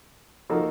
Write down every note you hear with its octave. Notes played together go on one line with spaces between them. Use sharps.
F3 A#3 D#4 F#4 A4